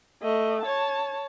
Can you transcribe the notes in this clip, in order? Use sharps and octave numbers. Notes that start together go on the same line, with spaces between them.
A3 D#5
C#5 A5